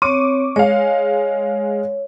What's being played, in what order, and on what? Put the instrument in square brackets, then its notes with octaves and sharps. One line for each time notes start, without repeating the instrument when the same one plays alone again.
[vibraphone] C4 C#5 [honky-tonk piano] C#6 D6 D#7
[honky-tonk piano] G#3 F5 [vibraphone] C#5